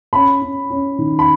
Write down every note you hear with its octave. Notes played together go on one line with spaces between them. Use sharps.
C#4 B5
C#4
C#4
D#3
B5